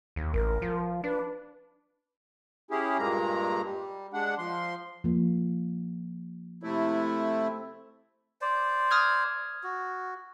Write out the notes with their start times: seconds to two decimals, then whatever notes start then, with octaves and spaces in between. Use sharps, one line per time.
0.16 D#2
0.34 A1 A#4
0.62 F3
1.04 D4 B4
2.71 C#4 E4 G4 G#4
2.98 G2 A#2 G#3 A#3 A#5
3.63 G3
4.13 G#3 D4 F#5
4.38 F3 C6
5.04 F3 A#3
6.63 C3 A3 E4
8.41 C5 D5
8.91 D#6 F6 G#6
9.64 F#4